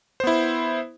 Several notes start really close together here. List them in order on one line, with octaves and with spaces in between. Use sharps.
C5 B3 E4